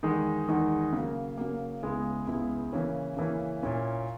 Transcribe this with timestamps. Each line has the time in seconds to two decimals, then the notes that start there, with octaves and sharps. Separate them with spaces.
0.03 E2 D#3 G#3 D#4
0.48 E2 D#3 G#3 D#4
0.93 C#3 F#3 A#3
1.38 C#3 F#3 A#3
1.83 C#2 C#3 G#3 B3 E4
2.27 C#2 C#3 G#3 B3 E4
2.73 C#3 E3 A#3 C#4 E4
3.17 C#3 E3 A#3 C#4 E4
3.63 A#2 A#3 C#4 E4